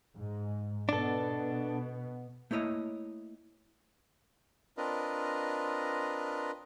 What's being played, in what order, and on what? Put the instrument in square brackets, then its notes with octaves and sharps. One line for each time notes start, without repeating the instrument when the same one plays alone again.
[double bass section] G#2
[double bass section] B2 B3 [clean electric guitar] D4 A4
[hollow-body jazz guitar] A3 A#3 E4 C#5 D#5
[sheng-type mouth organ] C4 D4 F4 A#4 B4 D#5